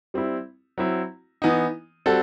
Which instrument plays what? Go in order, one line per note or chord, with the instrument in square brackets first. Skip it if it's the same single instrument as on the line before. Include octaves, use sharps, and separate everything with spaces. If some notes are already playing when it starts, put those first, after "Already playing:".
[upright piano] G3 C4 E4
F#3 C4 E4
E3 B3 D#4
G3 C4 F#4 A4